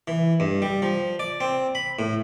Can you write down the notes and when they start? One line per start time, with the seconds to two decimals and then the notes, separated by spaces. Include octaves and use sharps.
0.08 E3
0.40 G2
0.62 G3
0.82 F3
1.19 D5
1.41 C4
1.75 B5
1.99 A2